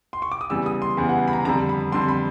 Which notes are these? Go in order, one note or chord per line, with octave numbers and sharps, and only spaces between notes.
C6
C#6
D6
D#6
E2 C#3 E3 G3 E6
D#6
C6
E2 C#3 E3 G3 B5
F#5
B5
A#5
F2 D3 G3 A#5
B5
F2 D3 G3 C6
B5